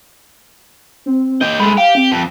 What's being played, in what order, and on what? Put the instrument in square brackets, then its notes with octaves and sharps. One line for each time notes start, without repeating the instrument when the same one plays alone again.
[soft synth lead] C4
[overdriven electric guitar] G4 D#5 [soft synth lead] G6
[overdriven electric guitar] G#3 A3 [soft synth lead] B5
[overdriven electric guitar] G4 [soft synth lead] F5
[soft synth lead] C4
[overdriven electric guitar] F2